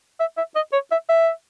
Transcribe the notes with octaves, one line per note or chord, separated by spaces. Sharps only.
E5
E5
D#5
C#5
E5
E5